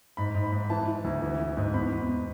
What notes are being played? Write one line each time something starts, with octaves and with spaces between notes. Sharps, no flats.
G#2 B5
G#2
B5
G#2
E3 A5
E3
D2
E3
E3
G#2
E2 B5
E2